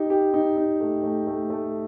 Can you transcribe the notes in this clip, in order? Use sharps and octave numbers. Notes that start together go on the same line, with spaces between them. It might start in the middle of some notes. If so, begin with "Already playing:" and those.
Already playing: D#4 G4
G4
D#4
D#4
A3
A3
A3
A3